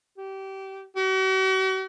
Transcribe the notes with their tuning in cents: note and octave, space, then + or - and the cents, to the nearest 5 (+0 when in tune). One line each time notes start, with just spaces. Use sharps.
G4 -25
F#4 +45